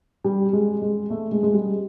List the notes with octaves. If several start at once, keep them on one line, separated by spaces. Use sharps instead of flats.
G3
G#3
G#3
A3
G#3
G#3
G3